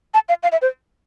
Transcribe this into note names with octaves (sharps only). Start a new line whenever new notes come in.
A5
F5
F5
E5
C5